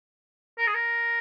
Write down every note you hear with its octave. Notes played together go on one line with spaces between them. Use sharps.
A#4
G#4
A#4